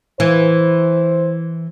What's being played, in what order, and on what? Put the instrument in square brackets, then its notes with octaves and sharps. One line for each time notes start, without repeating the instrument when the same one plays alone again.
[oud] E3 [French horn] C5